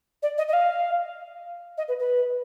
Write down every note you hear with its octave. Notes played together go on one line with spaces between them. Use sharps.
D5
D#5
D#5
F5
D#5
B4
B4